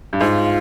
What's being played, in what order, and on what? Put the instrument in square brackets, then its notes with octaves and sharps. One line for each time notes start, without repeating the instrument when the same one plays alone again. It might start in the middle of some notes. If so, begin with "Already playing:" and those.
[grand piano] G2
[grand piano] G#2 [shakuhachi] F4